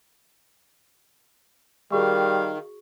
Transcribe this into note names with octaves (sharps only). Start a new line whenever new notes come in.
D#3 G3 F#4 G#4 F5 C#6